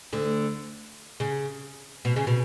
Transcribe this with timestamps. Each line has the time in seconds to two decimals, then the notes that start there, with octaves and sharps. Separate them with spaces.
0.12 D2 D3
1.20 C#3
2.05 B2
2.16 C#3
2.27 B2